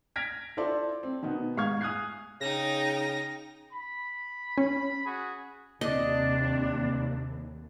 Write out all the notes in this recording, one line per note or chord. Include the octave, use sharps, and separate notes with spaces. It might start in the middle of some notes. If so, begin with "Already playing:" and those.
F6 G#6 A#6 B6 D7
E4 F4 A4 C5 D5
C4
B2 D#3 B3
G#2 F5 C#6 F6 G#6
G#5 D#6 F6 F#6 G#6 C7
C#3 D#4 G5 A#6
B5
C#4
F#4 G#4
D#2 C3 D4 D#5